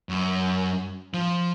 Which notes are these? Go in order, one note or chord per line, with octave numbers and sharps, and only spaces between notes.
F#2
F3